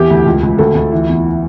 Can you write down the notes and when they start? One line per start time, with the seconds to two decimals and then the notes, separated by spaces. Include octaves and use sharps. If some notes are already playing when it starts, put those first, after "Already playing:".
Already playing: E2 E3 G4
0.10 D2
0.26 C#2
0.43 C#2
0.58 D2 A4
0.75 D2
0.92 E3
1.08 E2